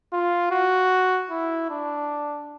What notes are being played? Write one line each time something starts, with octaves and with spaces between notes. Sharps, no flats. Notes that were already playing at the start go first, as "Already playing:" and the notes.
F4
F#4
E4
D4